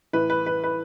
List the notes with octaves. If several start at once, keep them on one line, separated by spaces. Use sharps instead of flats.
A2 E3 B4
B4
B4
B4